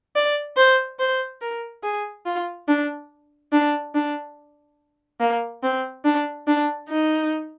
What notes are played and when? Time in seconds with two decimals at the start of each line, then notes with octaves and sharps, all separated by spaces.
0.16 D5
0.57 C5
0.99 C5
1.41 A#4
1.83 G#4
2.26 F4
2.68 D4
3.53 D4
3.95 D4
5.20 A#3
5.63 C4
6.05 D4
6.47 D4
6.89 D#4